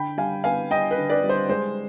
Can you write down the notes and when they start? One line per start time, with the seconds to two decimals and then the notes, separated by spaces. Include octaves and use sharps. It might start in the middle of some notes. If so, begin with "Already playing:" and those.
Already playing: D3 G5 B5
0.18 G3 F5 G#5
0.44 B3 F5 G#5
0.71 G3 D#5 G5
0.91 B4
0.97 D3
1.10 B4 D5
1.23 G3
1.29 C5
1.49 G#3 C5